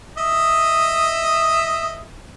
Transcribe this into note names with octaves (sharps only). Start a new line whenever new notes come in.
D#5 E5 D#6